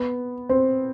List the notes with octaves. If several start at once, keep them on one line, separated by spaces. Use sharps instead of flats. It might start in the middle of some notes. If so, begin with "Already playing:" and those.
Already playing: B3
C4